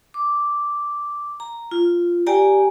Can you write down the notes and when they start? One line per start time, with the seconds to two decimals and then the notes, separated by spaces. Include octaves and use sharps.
0.14 D6
1.40 A#5
1.71 F4
2.27 G4 D5 G5 G#5 A#5